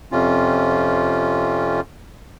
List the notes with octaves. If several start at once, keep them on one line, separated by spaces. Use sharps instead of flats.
F2 C3 C#4 F4